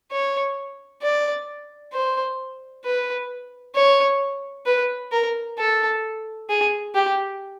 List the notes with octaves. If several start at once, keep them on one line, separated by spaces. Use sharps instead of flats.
C#5
D5
C5
B4
C#5
B4
A#4
A4
G#4
G4